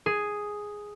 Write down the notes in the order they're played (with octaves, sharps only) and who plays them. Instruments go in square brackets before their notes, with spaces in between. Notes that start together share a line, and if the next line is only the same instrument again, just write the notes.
[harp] G#4